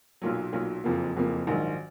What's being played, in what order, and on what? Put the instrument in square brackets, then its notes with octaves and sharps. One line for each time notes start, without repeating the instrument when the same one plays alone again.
[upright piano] B1 A#2 F#3
B1 A#2 F#3
F#1 F2 F3 A#3
F#1 F2 F3 A#3
A#1 G#2 D#3 F#3